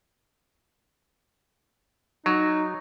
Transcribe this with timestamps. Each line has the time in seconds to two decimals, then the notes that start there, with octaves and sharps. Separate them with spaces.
2.26 F#3 D#4